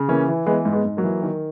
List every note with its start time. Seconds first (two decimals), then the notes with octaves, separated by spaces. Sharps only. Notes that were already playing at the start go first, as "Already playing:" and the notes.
Already playing: C#3
0.08 E3 A#3 C#4
0.28 E3
0.46 E3 G#3 B3
0.65 G#2
0.72 G#3 B3
0.85 G#2
0.97 F#3 A#3
1.04 E3
1.23 D#3